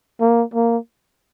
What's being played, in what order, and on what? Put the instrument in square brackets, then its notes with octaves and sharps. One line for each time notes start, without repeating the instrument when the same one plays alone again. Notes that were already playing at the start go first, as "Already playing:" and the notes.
[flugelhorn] A#3
A#3